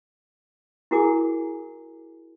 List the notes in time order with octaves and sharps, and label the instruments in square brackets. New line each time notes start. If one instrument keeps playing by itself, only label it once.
[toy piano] E4 F#4 G#4 A#4 G#5 D6